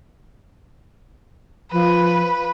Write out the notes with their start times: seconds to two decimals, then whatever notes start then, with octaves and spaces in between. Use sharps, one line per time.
1.72 F3 B4